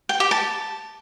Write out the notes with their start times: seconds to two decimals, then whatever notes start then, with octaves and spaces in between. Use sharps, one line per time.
0.09 G5
0.20 G4
0.31 A5